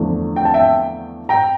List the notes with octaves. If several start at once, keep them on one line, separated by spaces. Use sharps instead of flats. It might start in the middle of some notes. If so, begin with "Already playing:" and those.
Already playing: E2 D3 F3 A3
G5
A5
E5 G5
G5 A#5